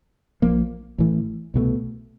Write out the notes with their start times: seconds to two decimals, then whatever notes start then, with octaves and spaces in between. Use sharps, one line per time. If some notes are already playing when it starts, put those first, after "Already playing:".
0.42 A#1 A#2 F3 A#3
0.98 A1 A2 E3 A3
1.54 C2 B2 F#3 A3